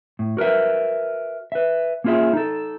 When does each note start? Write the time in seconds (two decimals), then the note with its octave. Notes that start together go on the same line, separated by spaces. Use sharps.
0.19 A2
0.37 F#4 A#4 B4 E5
1.52 B4 E5
2.04 A#3 C#4 F4 G#4 E5
2.33 D#4 A4